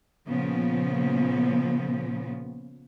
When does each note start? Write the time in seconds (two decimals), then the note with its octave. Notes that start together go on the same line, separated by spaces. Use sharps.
0.27 A#2 C#3 F3 B3